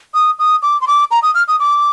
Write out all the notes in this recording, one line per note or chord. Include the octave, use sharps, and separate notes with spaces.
D#6
D#6
D6
C6
D6
A#5
D#6
F6
D#6
D6